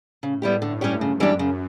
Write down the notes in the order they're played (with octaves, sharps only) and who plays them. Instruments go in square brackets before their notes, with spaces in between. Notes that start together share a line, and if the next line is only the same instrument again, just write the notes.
[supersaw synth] A2 [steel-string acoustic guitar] C#3
[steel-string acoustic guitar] G3 B3 E4 G4
[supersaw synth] G2 [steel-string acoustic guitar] D3
[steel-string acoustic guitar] G3 C#4 G4 C#5
[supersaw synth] F#2 [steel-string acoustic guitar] C#3
[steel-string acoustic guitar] E3 G3 D4 G4
C#3